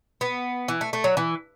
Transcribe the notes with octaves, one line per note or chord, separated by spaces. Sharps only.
B3
E3
A3
A3
F#3
E3